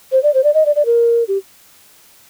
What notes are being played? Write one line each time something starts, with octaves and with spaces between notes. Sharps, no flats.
C5
D5
C5
D5
D#5
D5
D5
A#4
G4